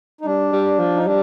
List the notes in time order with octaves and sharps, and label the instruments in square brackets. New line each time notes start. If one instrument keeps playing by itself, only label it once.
[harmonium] D#4
[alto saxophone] G3 [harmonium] D4
[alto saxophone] G3
F3
[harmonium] D#4
[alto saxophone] G3 [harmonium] D4